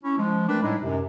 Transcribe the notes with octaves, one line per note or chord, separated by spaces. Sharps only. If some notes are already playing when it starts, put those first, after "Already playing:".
C#4 E4
F3 G#3
A3 C4 D4 A#4 B4
A2 G3 G#3 D#4 E4
F#2 C3